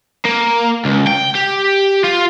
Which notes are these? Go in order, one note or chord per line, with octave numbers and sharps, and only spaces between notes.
A#3
C#2
G5
G4
F4